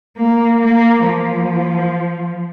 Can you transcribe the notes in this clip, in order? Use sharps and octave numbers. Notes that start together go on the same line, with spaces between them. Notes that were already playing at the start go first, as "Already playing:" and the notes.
A#3
A#3
F3